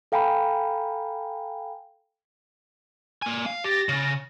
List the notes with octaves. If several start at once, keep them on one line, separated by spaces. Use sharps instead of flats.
A4 F5 G5 G#5 A#5 B5
A#3 G#5
F5
G4 A6 A#6
C#3